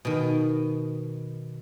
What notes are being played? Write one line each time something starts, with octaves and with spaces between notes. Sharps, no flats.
B2 D#3